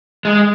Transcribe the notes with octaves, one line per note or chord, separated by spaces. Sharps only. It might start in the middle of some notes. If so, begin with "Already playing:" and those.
G#3